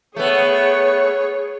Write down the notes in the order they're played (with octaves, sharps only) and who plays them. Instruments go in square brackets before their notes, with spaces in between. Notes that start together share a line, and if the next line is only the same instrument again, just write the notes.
[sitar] A3 B3 [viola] G#4 C#5